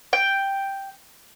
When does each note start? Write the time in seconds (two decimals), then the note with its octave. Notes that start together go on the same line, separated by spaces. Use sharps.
0.13 G5